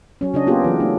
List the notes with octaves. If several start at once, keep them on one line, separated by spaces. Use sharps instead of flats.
F#3 C#4
C#3 D4 D#5
A#3 B3 F4 G4 G#4
E3 F#3
A3 D4